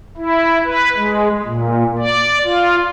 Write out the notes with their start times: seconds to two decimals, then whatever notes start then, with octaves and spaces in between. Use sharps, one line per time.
0.17 E4
0.64 B4
0.96 G#3
1.45 A#2
1.98 D5
2.44 F4